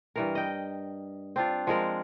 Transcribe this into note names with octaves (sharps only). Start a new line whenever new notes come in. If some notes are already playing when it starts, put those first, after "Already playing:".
G2 E3 A#4
D#5 G5
C4 D4 F4
F3 G#3 A#4